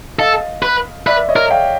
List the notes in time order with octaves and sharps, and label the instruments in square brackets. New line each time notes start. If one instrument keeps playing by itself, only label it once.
[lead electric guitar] A4 [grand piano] D#5 F5
[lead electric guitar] B4
[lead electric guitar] B4 [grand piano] D5 E5
[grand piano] C#5 D#5
[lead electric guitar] A#4
[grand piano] F5 G5